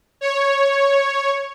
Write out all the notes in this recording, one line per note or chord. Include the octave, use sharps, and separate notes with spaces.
C#5